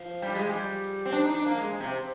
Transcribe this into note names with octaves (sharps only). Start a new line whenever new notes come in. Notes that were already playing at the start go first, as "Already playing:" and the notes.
Already playing: F3
G3
G#3
G3
C4
D4
D#4
D4
A#3
G#3
C3